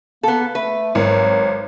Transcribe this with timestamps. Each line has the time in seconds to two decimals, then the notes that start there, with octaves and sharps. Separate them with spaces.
0.23 A#3 B3 A4
0.55 A3 B4
0.95 G#1 F#3